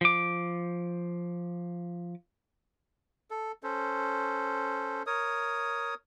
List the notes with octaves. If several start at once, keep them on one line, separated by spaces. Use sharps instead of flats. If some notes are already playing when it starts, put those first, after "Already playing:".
F3 D6
A4
C#4 A4 C5
A#4 C#5 D#6